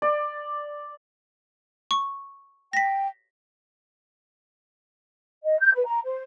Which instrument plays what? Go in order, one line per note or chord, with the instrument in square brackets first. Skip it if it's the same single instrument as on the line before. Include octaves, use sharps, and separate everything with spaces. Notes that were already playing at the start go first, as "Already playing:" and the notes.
[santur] D5
[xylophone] C#6
[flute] G5 [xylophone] A#6 B6
[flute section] D#5
G6
B4
A#5
C5